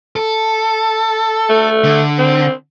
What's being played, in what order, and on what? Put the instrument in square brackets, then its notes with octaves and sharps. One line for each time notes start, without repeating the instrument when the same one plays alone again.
[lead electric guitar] A4
[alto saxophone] A3
[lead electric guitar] D3
[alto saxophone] C4